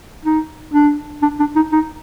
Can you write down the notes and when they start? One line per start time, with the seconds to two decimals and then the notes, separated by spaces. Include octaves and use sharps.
0.25 D#4
0.74 D4
1.23 D4
1.40 D4
1.56 D#4
1.72 D#4